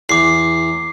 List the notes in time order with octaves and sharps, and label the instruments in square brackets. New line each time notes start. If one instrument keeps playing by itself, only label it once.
[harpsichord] E2 [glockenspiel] D6 C7